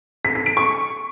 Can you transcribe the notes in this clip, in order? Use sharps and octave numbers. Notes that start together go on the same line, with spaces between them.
B6
B6
D7
C#6